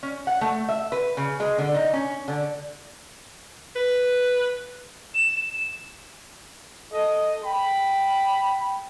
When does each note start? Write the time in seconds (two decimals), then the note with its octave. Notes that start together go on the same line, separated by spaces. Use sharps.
0.03 C#4
0.27 F#5
0.41 A3
0.68 E5
0.92 B4
1.17 C#3
1.40 G#3
1.58 D3
1.74 D#4
1.93 C#4
2.28 D3
3.76 B4
5.14 E7
6.92 A4 D#5
7.44 G5 B5